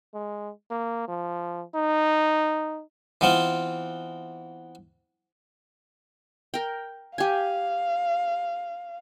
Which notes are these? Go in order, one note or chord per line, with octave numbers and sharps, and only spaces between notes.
G#3
A#3
F3
D#4
E3 B3 C4 F4
A#4 G5
G4 F5 G#5